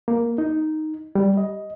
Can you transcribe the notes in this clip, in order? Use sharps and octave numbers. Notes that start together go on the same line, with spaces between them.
A#3
D#4
G3
D#5